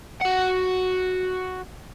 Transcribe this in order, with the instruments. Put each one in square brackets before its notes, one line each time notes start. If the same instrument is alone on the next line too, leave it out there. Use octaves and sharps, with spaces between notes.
[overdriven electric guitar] F#4 F#5